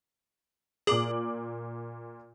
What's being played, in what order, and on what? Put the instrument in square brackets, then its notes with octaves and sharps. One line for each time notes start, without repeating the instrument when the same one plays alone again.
[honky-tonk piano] A#2 D6 F#7 [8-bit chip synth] G#4